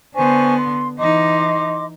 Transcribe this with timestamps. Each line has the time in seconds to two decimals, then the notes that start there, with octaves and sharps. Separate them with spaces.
0.16 D3 B3 C5 G#5 C#6
0.58 C6
0.99 E3 D#4 D#5 C6 D6